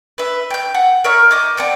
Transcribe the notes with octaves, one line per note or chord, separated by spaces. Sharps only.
B4 E5
G5 G6
F#5
A#4 C#5 E5
D#5 D6 G6
C4 D5 F#5 G5